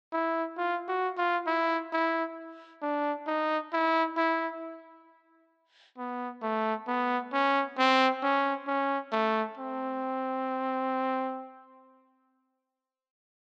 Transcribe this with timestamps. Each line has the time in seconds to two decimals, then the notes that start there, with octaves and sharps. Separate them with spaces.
0.13 E4
0.58 F4
0.88 F#4
1.18 F4
1.47 E4
1.93 E4
2.82 D4
3.27 D#4
3.73 E4
4.17 E4
5.98 B3
6.43 A3
6.87 B3
7.33 C#4
7.78 C4
8.23 C#4
8.67 C#4
9.12 A3
9.58 C4